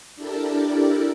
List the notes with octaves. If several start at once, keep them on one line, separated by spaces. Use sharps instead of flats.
D4 E4 G4 A4 A#4 D5